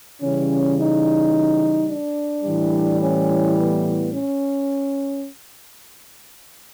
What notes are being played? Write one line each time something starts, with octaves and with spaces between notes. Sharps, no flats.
C#3 E3 G3 C#4
D#4
D4
A2 E3 G3
C#4
B3
C#4